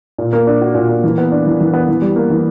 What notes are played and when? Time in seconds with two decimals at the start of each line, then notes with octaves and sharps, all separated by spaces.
0.18 A#2
0.33 A#3
0.47 D4
0.61 F#4
0.75 A#2
0.89 A#3
1.04 E3
1.18 B3
1.32 D4
1.46 E3
1.61 E3
1.74 B3
1.88 E3
2.02 G3
2.16 A#3
2.30 E3